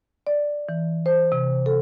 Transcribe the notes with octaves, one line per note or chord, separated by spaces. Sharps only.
D5
E3
C5
C3
A4